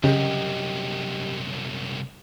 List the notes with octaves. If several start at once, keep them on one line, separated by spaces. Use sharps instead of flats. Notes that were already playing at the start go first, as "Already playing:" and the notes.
C2 F#2 C#3 G4 D#5